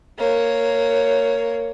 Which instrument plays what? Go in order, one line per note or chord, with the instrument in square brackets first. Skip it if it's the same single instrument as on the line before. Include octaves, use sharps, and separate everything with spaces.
[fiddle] A#3 C#5